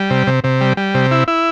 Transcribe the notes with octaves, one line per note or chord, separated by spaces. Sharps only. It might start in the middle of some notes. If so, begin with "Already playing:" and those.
Already playing: G3
C3
C3
C3
G3
G3
C3
E4
E4